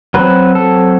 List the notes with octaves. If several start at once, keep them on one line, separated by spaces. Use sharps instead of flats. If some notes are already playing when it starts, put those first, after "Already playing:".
F#3 C4 B4
A4